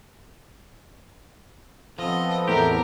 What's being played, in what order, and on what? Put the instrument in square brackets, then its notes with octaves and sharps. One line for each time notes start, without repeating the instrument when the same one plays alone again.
[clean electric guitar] F3 [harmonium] B3 C4 A4 [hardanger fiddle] D#5
[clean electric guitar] E2 G4 [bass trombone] A2 [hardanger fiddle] A#4